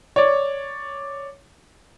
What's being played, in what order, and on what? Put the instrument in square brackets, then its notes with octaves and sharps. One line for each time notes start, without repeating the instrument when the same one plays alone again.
[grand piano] C#5 D5